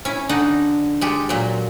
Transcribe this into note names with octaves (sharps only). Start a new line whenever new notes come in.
C#4 E4
D3 D#4 F#5
G#3 G4 A4
A#2 F#3